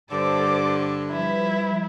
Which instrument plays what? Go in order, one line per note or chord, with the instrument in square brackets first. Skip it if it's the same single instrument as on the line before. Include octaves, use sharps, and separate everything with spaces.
[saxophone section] G2 D3 [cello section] A4 C5 [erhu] D6
[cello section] F3 G3 B4 [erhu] E4